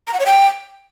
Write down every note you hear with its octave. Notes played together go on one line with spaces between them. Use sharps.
A#5
F#5
C#5
G5